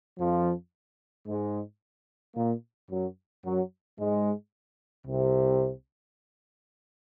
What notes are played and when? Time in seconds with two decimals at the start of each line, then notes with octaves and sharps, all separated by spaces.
0.19 F2 F3
1.27 G#2 G#3
2.36 A#2 A#3
2.90 F#2 F#3
3.45 F#2 F#3
3.99 G#2 G#3
5.06 C2 C3